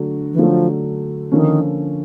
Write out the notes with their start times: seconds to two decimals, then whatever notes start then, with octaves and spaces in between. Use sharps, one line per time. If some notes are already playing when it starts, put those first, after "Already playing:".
Already playing: D3 F#3 A3 D4 F#4
0.33 E3
0.39 D3 F3 F#3 A3 D4 F#4
1.32 D3 D#3 F3 A#3 C#4